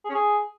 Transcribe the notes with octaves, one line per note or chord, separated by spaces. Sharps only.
G#4
C#4
G#4